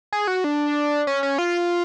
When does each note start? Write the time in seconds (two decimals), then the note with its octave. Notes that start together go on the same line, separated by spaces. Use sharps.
0.13 G#4
0.28 F#4
0.44 D4
1.07 C#4
1.23 C#4
1.38 F4